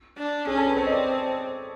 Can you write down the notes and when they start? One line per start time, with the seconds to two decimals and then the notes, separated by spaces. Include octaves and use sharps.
0.18 D4
0.47 C#4 G#4
0.57 A4
0.67 B4
0.76 C4 C#5
0.86 D#5
0.92 D5